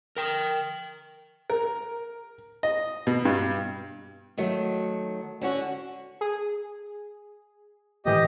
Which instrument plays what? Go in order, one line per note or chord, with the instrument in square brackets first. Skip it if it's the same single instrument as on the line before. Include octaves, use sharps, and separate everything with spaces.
[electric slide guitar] A#4 G5
[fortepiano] A#4
D#5
B2
G2
[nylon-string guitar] D#3 F#3 A3
D3 C#4 F#4
[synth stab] G#4
[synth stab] G#1 A2 E3 [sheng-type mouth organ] G4 D#5